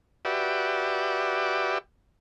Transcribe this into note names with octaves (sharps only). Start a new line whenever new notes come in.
F#4 G4 B4 D5 E5